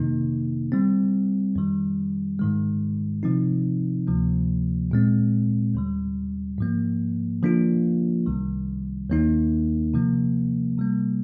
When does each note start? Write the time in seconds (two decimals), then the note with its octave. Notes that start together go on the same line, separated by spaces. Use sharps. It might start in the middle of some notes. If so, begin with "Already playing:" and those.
Already playing: F2 C3 D#3 A#3 D#4
0.72 D3 G3 C4
1.56 F2 D#3 G3
2.39 G#2 D#3 G#3
3.23 C3 F3 C4 D#4
4.07 D2 C3 F3 A#3
4.91 A#2 G#3 C4
5.75 D#2 D3 G3
6.58 G#2 F3 A#3
7.43 D3 F3 A#3 D4 F4
8.26 C2 C3 D#3 G3
9.10 D#2 D#3 A#3 D#4
9.94 C3 F3 A#3
10.78 C3 G3 A#3